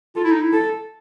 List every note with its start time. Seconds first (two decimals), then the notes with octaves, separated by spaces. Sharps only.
0.16 F4 A4
0.24 E4
0.32 D#4
0.41 E4
0.53 A4